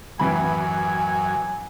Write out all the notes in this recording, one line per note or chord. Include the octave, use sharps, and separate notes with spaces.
A1 F#2 E3 G#5 B5